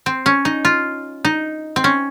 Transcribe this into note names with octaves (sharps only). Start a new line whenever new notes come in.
C4
C#4
D#4
F4
D#4
C4
C#4